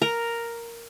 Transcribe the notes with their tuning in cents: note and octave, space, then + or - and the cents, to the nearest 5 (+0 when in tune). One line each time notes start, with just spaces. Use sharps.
A#4 +0 A#5 +0